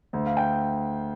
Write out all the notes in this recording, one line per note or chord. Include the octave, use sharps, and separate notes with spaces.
D2
F5
G5